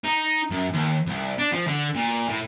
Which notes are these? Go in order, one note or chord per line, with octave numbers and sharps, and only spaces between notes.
D#4
F#2
D#2
C2
D4
F3
D3
A#2
A2